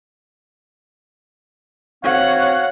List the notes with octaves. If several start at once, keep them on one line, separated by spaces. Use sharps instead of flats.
C4 F#4 C#5 F5 F#5